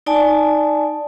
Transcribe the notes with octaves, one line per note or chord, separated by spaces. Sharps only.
D#4 D5 G#5 A5